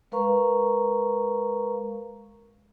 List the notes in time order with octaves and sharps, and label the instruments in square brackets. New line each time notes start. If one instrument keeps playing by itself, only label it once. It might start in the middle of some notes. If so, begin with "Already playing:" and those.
[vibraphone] G#3 A#4 B4 F5 A#5 C#6